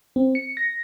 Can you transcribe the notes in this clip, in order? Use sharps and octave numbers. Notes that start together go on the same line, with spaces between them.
C4
C#7
A#6